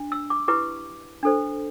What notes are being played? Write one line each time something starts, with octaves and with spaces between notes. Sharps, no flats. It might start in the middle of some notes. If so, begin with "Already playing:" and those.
Already playing: D4
E6
D6
E4 G4 B4 D6
D4 A4 C5